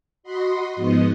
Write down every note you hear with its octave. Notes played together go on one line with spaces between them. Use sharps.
F#4 D#5 B5 C6
G#2 F3 B3 D#5